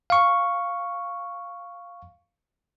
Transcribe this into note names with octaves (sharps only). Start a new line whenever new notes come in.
F5 C#6